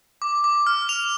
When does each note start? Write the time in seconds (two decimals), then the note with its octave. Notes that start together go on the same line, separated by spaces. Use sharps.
0.22 D6
0.44 D6
0.67 F6
0.89 F7